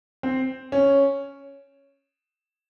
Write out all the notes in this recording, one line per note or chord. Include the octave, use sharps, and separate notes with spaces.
C4
C#4